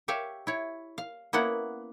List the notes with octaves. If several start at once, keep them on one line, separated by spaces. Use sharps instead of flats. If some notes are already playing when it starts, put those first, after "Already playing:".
G4 C#5 E5 F5 G5
E4 C#5
F5
A#3 B3 C#4 E4 F#5